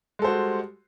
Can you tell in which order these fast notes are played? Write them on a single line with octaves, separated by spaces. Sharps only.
G#3 A4 C5 F#4 G3